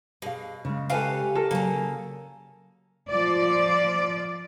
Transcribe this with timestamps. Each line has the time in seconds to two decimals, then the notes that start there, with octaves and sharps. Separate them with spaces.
0.22 B2 G4 G#4 F5
0.65 C#3 G#3
0.90 C#4 G4 A4 B4 F5
1.35 A4 A#4
1.51 C#3 F#3 A#3 C#4 A5
3.08 F3 D5